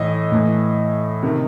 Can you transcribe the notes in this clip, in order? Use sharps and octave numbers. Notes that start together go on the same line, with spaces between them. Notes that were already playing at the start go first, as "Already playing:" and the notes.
Already playing: A2 E3 D#5
A2 E3
C3 D#3